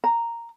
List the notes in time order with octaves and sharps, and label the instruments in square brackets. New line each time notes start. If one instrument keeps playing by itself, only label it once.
[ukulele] A#5